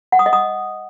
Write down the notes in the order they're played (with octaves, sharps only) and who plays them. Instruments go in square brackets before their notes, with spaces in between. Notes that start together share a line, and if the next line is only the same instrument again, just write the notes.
[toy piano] F#5
D#6
D#5
D#6